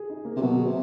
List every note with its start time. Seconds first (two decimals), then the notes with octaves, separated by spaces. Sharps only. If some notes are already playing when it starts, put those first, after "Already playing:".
Already playing: G#4
0.10 D#4
0.25 A#3
0.36 C3
0.41 B2 F#3
0.58 G#4
0.66 C3